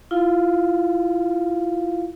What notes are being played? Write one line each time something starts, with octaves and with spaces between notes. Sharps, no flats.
E4 F4 F5